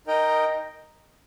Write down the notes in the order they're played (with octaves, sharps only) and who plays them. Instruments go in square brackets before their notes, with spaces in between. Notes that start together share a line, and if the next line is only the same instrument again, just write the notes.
[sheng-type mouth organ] D#4 A#4 D#5 G5